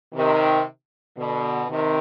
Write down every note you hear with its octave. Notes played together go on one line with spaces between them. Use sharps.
C3 D#3
B2 D3
C3 D#3